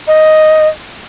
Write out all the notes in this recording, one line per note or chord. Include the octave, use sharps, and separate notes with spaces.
D#5